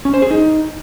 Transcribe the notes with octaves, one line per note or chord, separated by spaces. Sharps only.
C#4
C5
G#4
D#4